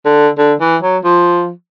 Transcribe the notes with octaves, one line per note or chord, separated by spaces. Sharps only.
D3
D3
E3
F#3
F3